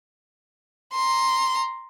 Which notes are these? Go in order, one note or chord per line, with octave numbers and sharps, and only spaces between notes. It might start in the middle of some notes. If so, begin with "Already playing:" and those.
A#5 C6